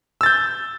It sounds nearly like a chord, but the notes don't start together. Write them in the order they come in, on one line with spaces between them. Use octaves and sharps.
E6 A6 G6